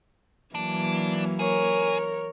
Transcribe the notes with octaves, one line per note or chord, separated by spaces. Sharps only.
E3 F#3 A#3 D4
G#4 A#4 C#5